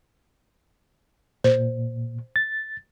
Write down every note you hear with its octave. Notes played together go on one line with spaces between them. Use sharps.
A#2 C5
A6